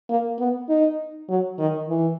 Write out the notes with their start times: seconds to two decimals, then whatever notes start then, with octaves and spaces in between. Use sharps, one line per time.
0.09 A#3
0.39 B3
0.69 D#4
1.29 F#3
1.59 D#3
1.88 E3